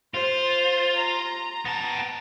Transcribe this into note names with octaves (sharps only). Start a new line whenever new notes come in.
F4 C5
A#5
B3 A5